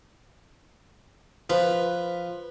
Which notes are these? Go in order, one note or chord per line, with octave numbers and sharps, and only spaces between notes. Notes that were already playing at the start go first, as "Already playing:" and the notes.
F3 B4